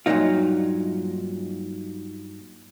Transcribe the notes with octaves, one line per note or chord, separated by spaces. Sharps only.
G2 A#2 E3 F#3 D#4 F4